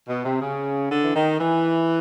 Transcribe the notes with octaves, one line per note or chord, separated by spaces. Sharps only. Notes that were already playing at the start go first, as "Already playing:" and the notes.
B2
C3
C#3
D3
E3
D#3
E3